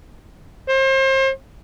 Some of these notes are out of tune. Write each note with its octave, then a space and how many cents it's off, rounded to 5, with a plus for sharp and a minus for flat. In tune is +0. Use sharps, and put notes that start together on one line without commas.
C5 +35